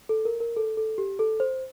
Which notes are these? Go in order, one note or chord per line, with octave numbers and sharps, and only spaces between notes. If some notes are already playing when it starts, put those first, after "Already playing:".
A4
A#4
A#4
A4
A4
G4
A4
C5